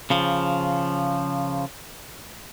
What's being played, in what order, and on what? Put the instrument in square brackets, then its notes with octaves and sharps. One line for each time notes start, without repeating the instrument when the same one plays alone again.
[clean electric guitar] C#3 F3